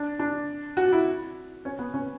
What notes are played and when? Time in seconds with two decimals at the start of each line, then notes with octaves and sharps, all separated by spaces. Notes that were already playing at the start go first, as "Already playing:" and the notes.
Already playing: D4
0.19 D4
0.77 F#4
0.92 E4
1.65 C#4
1.79 B3
1.94 C#4